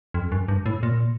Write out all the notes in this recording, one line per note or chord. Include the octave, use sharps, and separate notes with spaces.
F2
F#2
G2
A2
A#2